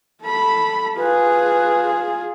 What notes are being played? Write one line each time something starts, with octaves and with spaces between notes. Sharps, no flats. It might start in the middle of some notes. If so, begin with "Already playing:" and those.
A4 B5
F4 G#4 B4